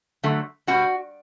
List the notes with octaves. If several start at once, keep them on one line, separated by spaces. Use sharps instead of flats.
D3 F#3 A3
B2 G3 F#4